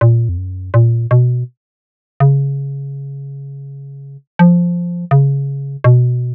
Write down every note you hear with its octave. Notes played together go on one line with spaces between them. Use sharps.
A#2
F2
F#2
A#2
B2
C#3
F3
C#3
B2